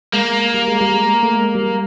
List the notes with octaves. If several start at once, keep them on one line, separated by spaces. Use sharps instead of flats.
G#3 A#3
G3
G#3
G3
G#3
A3
G#3
G3